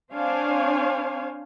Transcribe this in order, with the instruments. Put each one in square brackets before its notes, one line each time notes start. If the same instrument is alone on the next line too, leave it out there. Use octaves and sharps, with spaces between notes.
[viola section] C4 D4 C5 C#5 F5 G#5